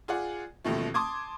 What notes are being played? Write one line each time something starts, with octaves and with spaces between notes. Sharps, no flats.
F4 G#4 D5 F#5
A1 D#2 B2 F3 A3
A5 C6 D6 D#6 G#6